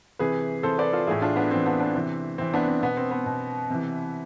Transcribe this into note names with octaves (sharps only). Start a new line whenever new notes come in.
C3 E3 G#4 B4
C3 E3 A4 C5
B4 D5
F4 A4
A2 E3 E4 G#4
D4 F4
B3 D4
A2 E3 C4
B3 D4
B3 D4
C3 E3 C4
C3 E3 C4
B3 D4
C4
B2 B3
C4
B3
B2
C3 E3